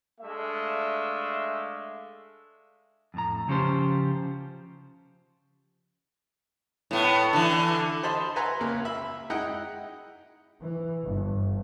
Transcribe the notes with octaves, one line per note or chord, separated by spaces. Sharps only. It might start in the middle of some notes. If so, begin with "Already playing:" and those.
G#3 A3 D4 E5 F5
F2 A2 A#5
C#3 F3 C#4 G4 C5
A2 B3
D3 E3
C5 D#5 A5 B5 C6
B4 E5 F#5 G#5 A#5 C6
C#2 A#3
E5 B5
G#3 D#4 E4 D#5 F#5 G5
E3
G1